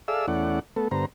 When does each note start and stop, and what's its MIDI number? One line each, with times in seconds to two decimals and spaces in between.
0.08 0.26 68
0.08 0.26 69
0.08 0.26 74
0.08 0.26 76
0.08 0.26 77
0.08 0.26 88
0.28 0.59 40
0.28 0.59 57
0.28 0.59 61
0.28 0.59 64
0.28 0.59 74
0.28 0.59 78
0.76 0.88 57
0.76 0.88 59
0.76 0.88 69
0.91 1.06 43
0.91 1.06 50
0.91 1.06 59
0.91 1.06 72
0.91 1.06 82